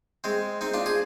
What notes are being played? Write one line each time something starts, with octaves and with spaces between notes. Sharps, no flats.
G#3 C4
C4 D#4
D4 F4
G#4 C5